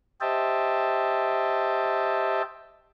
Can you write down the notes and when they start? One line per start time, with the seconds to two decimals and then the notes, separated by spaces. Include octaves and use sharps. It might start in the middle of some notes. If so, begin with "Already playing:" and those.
0.21 G4 C5 D#5 E5 G5 A5